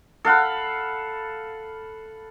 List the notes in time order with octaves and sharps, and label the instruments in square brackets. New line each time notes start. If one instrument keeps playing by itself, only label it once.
[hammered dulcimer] A4 F5 F#5 B5